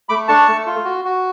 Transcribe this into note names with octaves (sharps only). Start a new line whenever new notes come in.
A3 B5 D6
D4 A5 C#6
A3
F4
F#4
F#4